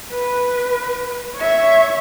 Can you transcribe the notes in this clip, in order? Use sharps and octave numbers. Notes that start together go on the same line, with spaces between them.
B4
C#5 E5